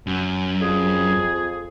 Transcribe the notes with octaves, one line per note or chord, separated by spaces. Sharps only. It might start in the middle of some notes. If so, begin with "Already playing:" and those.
F#2
F2 G#4